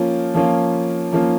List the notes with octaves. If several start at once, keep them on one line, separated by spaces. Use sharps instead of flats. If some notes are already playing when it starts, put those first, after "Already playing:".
Already playing: F3 A#3 C#4 F4
F3 A#3 C#4 F4
F3 A#3 C#4 F4